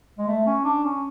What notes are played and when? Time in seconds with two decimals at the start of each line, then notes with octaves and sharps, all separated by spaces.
0.18 G#3
0.28 A3
0.46 C#4
0.65 D4
0.84 C#4